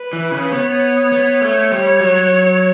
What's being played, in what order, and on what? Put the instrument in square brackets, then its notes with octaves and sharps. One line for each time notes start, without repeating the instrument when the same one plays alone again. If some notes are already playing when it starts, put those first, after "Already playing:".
Already playing: [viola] B4
[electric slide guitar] E3
C#3
[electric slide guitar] B3 [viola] C#5
[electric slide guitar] B3
A3
[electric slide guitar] G3 [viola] C#5
[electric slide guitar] F#3